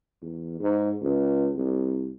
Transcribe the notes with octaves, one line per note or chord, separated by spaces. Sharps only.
E2
G#2
C#2
C2